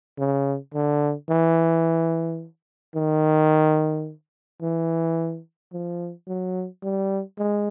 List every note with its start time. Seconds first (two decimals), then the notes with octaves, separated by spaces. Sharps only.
0.19 C#3
0.74 D3
1.29 E3
2.95 D#3
4.62 E3
5.73 F3
6.28 F#3
6.83 G3
7.38 G#3